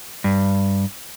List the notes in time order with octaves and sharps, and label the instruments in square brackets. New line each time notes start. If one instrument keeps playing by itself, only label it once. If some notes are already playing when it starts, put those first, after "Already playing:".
[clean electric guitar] G2